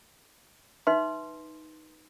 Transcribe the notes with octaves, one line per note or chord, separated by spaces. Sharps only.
D#4 B4 E5 C6